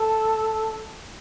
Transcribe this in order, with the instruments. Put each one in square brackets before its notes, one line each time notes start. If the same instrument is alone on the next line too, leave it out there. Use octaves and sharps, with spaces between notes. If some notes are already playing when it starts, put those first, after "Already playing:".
Already playing: [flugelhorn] A4